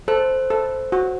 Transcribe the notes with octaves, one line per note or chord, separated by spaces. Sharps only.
A4 C5
A4
F#4